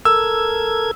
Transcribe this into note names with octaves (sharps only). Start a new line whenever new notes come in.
A4 A#4 E6 G#6